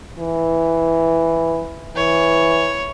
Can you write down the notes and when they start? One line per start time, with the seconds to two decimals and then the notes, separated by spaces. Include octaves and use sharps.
0.18 E3
1.96 E3 C#5